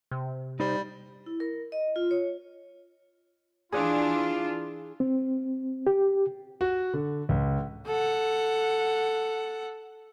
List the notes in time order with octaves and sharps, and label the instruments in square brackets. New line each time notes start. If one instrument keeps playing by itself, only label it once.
[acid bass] C3
[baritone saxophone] G3 [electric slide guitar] D#4 C5
[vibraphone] E4
A#4
D#5
F4
C#5
[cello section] E3 D4 [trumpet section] F4 [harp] G#4 D5 F#6
[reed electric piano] C4
G4
[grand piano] F#4
D3
C#2
[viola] A4 F#5